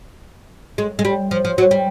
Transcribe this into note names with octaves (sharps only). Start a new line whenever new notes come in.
G#3
G#3
G3
F3
F3
F#3
G3